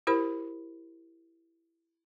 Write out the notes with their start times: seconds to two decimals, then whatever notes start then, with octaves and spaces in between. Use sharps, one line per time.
0.07 E4 G4 A#4 C5 B5